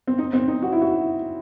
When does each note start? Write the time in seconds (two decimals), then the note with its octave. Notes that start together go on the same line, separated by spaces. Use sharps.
0.07 C4
0.18 D#4
0.33 C4
0.48 D#4
0.62 F#4
0.73 E4
0.81 F#4